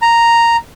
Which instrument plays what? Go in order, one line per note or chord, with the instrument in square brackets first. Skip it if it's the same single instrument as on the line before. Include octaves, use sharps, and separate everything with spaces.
[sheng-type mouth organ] A#5